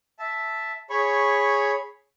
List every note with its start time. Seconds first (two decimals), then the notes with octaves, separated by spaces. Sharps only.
0.19 E5 A5
0.90 G#4 C#5 B5 C#6